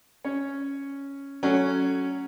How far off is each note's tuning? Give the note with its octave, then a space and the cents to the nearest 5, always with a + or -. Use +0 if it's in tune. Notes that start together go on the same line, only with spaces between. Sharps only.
C#4 +0 C#5 +0
F#3 +5 A3 +0 C#4 +0